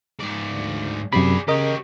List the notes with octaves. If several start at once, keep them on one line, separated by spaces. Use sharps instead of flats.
G#2 D5
D2
F#2 C3 G#4 D5 B5
C#3 G4 A#4 C#5 D#5